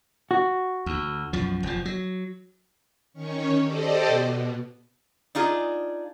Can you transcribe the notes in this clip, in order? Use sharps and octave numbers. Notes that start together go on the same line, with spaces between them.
F#4
D2
B1 F#2 F3
F1 F3
F#3
D#3 C#4 C#5
G4 A4 C5 D5 D#5
B2
D4 D#4 F4 G#4